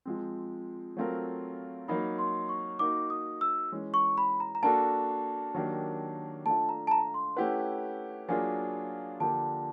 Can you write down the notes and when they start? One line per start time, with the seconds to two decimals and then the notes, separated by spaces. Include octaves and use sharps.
0.05 F3 G#3 C4
0.97 F#3 A3 C4 F4 A#4
1.88 F#3 A#3 D#4 B5
2.19 C6
2.49 C#6
2.79 A#3 D#4 F#4 D6
3.10 D#6
3.41 E6
3.72 E3 G#3 C#4
3.94 C#6
4.18 B5
4.40 A#5
4.55 A#5
4.63 A#3 D4 F#4 A4 A5
5.54 D#3 F#3 A#3 D4 G4
6.46 A3 D4 F4 A5
6.69 A#5
6.87 A5
6.91 A#5
7.14 C6
7.37 A3 C#4 E4 G4 B4 F#5
8.29 F#3 A#3 D4 F4 G#4 G#5
9.20 D3 F3 A#3 D4 G4 A5